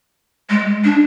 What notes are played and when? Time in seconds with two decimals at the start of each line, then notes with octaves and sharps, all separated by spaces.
0.50 G#3
0.84 D4